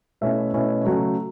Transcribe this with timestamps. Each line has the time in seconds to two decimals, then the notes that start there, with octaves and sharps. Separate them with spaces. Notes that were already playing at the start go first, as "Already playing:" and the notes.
0.21 B2 A3 C#4 E4 E5
0.53 B2 A3 C#4 E4
0.85 C#3 F#3 A3